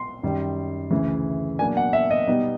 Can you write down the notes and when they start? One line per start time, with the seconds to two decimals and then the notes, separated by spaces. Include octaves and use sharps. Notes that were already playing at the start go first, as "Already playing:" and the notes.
Already playing: C6
0.23 F#2 D#3 G3
0.91 D2 C#3 E3
1.59 B2 F#3 A#3 D4 G#5
1.77 F#5
1.93 E5
2.11 D#5
2.27 B2 G3 B3 D#4